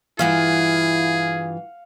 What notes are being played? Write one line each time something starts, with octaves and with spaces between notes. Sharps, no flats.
G2 E3 E4 F4 G#4 F5 F#5